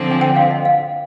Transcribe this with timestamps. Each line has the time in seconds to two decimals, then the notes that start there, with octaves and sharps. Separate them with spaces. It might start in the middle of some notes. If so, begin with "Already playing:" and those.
Already playing: D3 F3 C4
0.11 G#5
0.21 G5
0.36 F5
0.51 D#5
0.65 F5